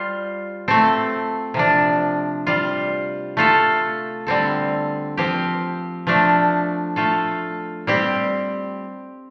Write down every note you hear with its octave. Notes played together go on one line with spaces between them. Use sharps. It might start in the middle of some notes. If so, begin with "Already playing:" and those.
Already playing: G3 F4 C5
A3 C4 A4
C3 F3 D4
G3 F4 C5
A3 F4 A4
D3 G3 C4 A4
F3 C4 G4
F3 A3 D4
A3 F4 A4
G3 C4 G4